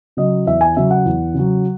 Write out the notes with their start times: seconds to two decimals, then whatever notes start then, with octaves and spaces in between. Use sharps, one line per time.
0.17 C#3 F#3 D#5
0.46 E2 E5
0.61 G#5
0.76 C#3 F#3 E5
0.91 F#5
1.05 E2
1.34 C#3 F#3